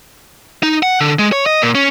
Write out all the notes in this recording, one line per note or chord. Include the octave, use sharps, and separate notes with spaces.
D#4
F#5
D3
G#3
C#5
D#5
A#2
C#4